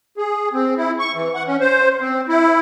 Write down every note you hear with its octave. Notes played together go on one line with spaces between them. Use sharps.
G#4
C4
E4
C#6
E3
F#5
C#4
C5
C4
E4